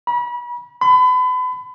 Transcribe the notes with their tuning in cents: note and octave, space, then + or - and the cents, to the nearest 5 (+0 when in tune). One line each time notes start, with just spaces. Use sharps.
B5 -35
B5 +35